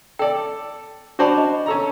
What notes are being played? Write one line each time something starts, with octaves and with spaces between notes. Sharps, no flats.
A4 D5 G5
D4 F#4 C5 D5 A5 B5
D#5
C#4 A4 A#5